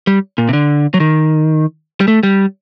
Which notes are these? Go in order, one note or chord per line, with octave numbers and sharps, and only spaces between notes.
G3
A#2
C3
D3
F#3
D#3
G3
A3
G3